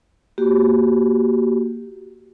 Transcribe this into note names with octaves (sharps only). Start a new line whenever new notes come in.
A#3 F#4 G4